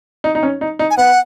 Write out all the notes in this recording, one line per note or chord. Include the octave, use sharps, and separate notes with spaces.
D#4
D#4
C#4
D#4
D#4
G#5
B3 F#5